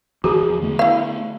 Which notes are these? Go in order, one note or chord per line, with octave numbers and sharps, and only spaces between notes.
E2 D#3 F3 F#4 G#4
D3 A3 B3
E4 F5